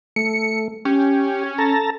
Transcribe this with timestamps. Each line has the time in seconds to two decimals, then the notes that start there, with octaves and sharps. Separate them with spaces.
0.16 A3 C#7
0.85 C#4 G4
1.58 A4 A5 A#5